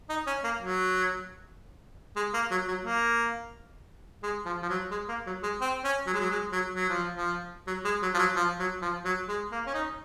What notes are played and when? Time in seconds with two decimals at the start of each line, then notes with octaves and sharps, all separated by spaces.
0.10 D#4
0.27 C#4
0.44 A#3
0.61 F#3
2.16 G#3
2.34 A#3
2.51 F#3
2.68 F#3
2.85 A#3
4.23 G#3
4.45 F3
4.62 F3
4.69 F#3
4.91 G#3
5.09 A#3
5.27 F#3
5.43 G#3
5.61 C4
5.84 C#4
6.07 F#3
6.14 G#3
6.20 F#3
6.30 G#3
6.52 F#3
6.75 F#3
6.89 F3
7.16 F3
7.67 F#3
7.85 G#3
8.02 F#3
8.14 F3
8.19 F#3
8.36 F3
8.59 F#3
8.82 F3
9.05 F#3
9.28 G#3
9.52 A#3
9.66 C#4
9.74 D#4